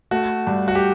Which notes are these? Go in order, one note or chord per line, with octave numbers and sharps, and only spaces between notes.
A3 F#4
G2
F#4
G4